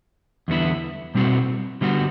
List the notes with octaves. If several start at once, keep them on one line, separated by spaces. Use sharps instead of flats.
E2 D3 G3 B3 E4
B2 G3 C4 F#4
D3 G3 B3 F#4